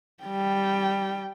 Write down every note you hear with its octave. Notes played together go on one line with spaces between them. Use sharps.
G3 G5